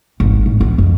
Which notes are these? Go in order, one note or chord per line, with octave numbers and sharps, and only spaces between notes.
G#1
A2
B3
F2